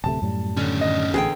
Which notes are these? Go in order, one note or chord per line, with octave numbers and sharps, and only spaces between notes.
D1 C3 A3 A5
F#2 A2 G3
D3 D#3 C#4
D#5
A1 E2 D3 G#4 G5